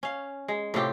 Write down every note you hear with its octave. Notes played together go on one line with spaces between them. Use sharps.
C#4 F5
G#3
A2 C3 F4 G4